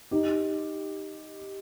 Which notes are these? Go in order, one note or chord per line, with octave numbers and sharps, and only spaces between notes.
D#4 G4